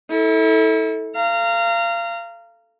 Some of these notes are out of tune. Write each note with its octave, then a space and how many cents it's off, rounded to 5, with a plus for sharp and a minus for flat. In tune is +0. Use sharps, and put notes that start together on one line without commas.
E4 -35 A4 +0
F5 -25 A#5 -20